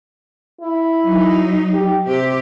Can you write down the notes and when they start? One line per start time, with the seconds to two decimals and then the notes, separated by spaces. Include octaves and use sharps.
0.61 E4
1.03 F#3 D#4
1.74 G4
2.07 C3 G4